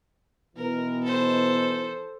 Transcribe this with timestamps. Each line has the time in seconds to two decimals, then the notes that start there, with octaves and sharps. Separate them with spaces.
0.56 B2 D#3 E3 A#4
1.04 A4 C5